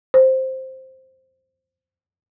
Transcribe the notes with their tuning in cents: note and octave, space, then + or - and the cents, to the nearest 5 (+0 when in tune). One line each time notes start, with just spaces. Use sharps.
C5 +5